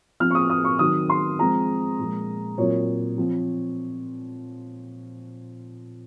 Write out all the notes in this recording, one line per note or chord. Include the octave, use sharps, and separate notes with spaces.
F3 C4 F6
C#6
D#6
D#6
C#6
D#3 F#3 C4 D#6
C6
F3 G#3 C4 A#5
A#2 F3 G#3
A#2 F#3 C4 C#5
F3 C4